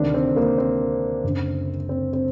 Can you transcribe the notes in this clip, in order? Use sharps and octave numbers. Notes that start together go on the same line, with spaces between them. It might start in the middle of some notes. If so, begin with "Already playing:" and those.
Already playing: D2 C3 D#3 D4
C4
A#3
C4
F#1 F#2 D3
C4
C4